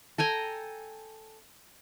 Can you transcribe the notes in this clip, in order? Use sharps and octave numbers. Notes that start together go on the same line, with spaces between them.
A4 G5 G#5 A#5